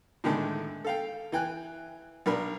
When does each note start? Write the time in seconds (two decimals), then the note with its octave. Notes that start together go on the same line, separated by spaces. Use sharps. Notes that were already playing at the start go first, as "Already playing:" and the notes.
0.24 A2 D3 D#3 G#3 A3
0.84 A4 F5 G5
1.32 E3 G5 G#5 F#6
2.26 B1 D4 A#4 B5